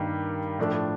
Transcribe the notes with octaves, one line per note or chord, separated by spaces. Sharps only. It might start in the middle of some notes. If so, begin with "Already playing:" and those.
Already playing: G2 D#3 G3 A#3
A2 F3 A3 D4 A4